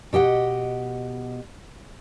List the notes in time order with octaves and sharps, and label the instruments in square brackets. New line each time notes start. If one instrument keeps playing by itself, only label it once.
[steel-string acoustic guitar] B2 G4 D#5 F#5